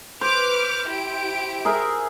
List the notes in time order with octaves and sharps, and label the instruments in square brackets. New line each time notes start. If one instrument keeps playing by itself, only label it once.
[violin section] B4 D6 F6 [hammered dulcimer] C5
[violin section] E4 G4 D7
[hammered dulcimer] G#4 A#4 E5